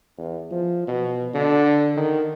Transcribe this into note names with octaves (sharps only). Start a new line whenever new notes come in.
E2
F3
B2
D3
D#3